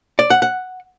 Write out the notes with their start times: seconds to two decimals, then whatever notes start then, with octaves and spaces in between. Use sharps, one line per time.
0.19 D5
0.30 F#5
0.42 F#5